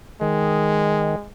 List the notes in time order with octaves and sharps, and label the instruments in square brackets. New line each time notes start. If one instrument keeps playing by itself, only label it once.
[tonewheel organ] D#3 [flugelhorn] G#3